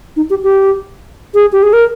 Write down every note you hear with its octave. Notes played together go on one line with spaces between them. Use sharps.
D#4
G4
G4
G#4
G4
G#4
A#4